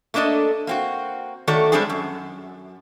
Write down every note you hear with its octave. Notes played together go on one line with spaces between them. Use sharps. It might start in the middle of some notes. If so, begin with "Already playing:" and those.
A3 A#3 D4 A4 D#5
A#3 C4 F#4
D#3 A3 F#4 A4 C#5 D5
G3 G#3 C4 D4 G#4 A4
F#2